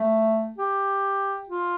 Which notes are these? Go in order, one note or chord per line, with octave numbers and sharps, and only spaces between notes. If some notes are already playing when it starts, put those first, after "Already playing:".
Already playing: A3
G4
F4